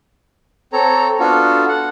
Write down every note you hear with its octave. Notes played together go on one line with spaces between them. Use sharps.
C4 A4 C#5 A#5
B3 D4 F4 F#4 A4
F#5